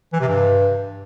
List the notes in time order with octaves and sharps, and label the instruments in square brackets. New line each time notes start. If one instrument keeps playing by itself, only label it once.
[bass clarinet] E3
C3
G2